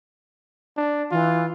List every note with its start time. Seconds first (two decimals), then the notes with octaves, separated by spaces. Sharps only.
0.77 D4
1.12 E3 F4